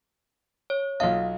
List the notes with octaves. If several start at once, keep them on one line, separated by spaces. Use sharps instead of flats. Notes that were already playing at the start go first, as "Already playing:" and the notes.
C#5
B1 F4 D#5 F5